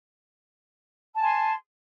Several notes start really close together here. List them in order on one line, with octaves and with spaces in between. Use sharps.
A5 G#5 C6